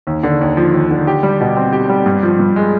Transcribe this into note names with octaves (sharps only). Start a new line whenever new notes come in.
D#2
D3
D#2
F3
D#2
D3
G4
G3
B2
C4
G4
G3
G2
F3
G2
G#3